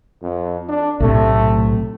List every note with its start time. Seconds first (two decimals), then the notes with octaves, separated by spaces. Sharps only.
0.22 F2
0.69 D4
1.00 B1 A2 C3 A3